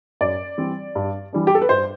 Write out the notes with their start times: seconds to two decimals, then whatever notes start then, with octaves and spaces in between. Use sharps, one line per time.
0.21 F#2 D5
0.58 E3 G3 C4
0.95 G2
1.33 E3 G3 D4
1.47 G4
1.55 A4
1.62 B4
1.69 G2 C5